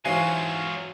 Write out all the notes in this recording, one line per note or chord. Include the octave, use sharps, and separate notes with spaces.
G#2 E3 F#3 C#4 F4 F#4 F5 G#5